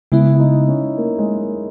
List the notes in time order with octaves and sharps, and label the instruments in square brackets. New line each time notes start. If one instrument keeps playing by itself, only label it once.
[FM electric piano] C#3 G#3 B3 [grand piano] E4
[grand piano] E4
D#4
C#4
A#3
G#3
A#3